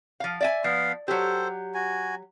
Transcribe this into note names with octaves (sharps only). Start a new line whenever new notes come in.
F3 F5
D5 E5 G#5
F3 B3 F5
F#3 G4 A4 C5
F#4 G#5